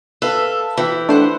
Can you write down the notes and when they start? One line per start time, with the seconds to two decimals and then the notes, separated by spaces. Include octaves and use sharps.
0.22 A4 B4 E5 F5
0.77 E3 G4
1.09 A3 D4 G4 C5 F#5